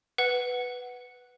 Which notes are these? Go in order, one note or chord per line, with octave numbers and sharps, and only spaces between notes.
B4 F#5